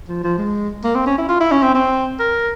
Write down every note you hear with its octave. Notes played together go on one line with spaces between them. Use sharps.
F3
F3
G#3
A#3
C4
C#4
E4
F4
E4
C#4
C4
C4
A#4